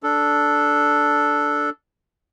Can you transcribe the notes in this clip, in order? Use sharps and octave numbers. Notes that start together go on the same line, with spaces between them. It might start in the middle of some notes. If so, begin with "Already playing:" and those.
D4 A4